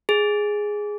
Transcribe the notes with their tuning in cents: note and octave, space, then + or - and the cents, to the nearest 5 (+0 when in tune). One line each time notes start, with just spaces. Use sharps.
G#4 +0